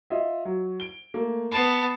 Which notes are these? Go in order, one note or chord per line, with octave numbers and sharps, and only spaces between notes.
F4 D#5 E5
F#3
D7 G7
A3 A#3
B3 A5 B5 C7